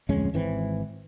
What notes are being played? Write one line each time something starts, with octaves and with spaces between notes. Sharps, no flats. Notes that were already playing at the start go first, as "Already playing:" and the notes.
D1 F2 G#3 C#4
G#1 E3 C4